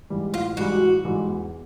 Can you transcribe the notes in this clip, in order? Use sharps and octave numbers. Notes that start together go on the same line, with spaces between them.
G#2 E3 G3
A1 F4
G#2 E3 G3 F#4
A1
G#2 E3 G3
E2